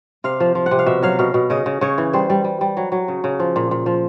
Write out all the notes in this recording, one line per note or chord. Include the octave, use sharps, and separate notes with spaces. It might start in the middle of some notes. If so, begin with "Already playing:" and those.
C3 F5
F3
F3
F#5
C3
F5
B2 E5
F#3 F5
B2 F5
B2
C#3 D#5
C#3
C#3 C#5
E3
G3 C5
G3
G3
G3
F#3
F#3
C#3
C#3
F3
A#2
A#2
F3